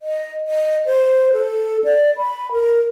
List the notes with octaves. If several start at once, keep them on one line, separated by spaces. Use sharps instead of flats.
D#5
D#5
C5
A4
D5
B5
A#4